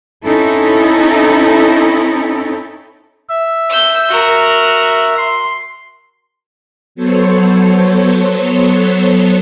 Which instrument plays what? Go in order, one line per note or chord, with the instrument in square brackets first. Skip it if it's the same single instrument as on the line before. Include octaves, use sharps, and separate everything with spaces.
[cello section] C4 C#4 D#4 E4 A4
[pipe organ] E5
[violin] E6 G6
F#4 A#4
[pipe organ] C6
[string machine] F#3 B3 A4 C5 C#5